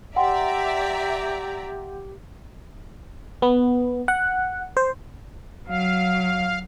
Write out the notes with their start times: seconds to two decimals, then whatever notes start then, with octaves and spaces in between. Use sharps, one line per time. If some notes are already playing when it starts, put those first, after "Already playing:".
0.16 G4 D5 E5 F#5 G5 A#5 C6
3.42 B3
4.08 F#5
4.77 C5
5.68 F#3 F5